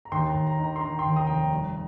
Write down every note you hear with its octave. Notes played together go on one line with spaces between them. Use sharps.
A#5
D#2 G5 C6
D#2 A#5
A#5
D#3
A#5
C6
D#3 A#5
G5 C6
D#2
A#5 D#6
F1 G5
A#5
G3